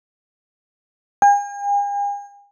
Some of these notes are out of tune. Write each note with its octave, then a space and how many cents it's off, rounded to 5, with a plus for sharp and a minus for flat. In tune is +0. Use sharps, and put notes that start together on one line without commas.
G#5 -45